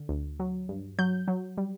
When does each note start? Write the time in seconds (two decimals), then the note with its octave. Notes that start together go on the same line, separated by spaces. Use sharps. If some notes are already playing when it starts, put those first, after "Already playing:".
Already playing: D3
0.09 D2
0.40 F#3
0.69 G2
0.99 F#3 G6
1.28 F#3
1.58 G3